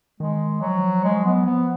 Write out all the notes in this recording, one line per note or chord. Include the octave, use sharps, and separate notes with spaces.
D#3 G#3
F3 F#3
F#3 G#3
F3
F#3
B3
F3 B3